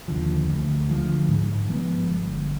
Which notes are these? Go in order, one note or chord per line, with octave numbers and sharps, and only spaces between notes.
D#2 D3 F3
D2
D3 F3 G#3
G#2
F3 G#3 B3
G1